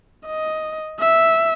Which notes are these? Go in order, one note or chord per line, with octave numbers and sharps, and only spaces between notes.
D#5
E5